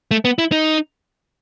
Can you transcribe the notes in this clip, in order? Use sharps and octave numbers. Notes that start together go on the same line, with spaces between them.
A3
B3
E4
D#4